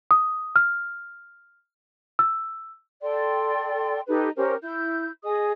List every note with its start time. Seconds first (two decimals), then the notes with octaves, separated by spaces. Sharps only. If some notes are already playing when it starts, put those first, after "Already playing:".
0.11 D#6
0.56 F6
2.19 E6
3.02 A4 D5 G5 C6
4.08 D#4 G4 A4 B4
4.36 C#4 G4 A#4 C5
4.62 E4 G6
5.24 G#4 D#5 D#6